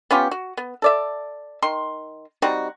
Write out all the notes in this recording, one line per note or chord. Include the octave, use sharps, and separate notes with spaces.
B3 C#4 F4 G4
F#4
B3
A4 D5 E5
D#3 C6
G3 C4 D#4 F#4